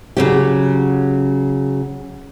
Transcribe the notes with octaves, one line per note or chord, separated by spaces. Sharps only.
C#3 F#3 G4